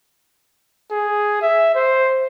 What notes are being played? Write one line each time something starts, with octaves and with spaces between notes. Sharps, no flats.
G#4
E5
C5